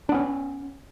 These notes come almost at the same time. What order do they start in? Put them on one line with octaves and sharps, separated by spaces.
D4 B3 C#4